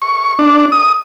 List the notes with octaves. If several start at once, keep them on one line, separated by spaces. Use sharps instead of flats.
C#6
D4
D#6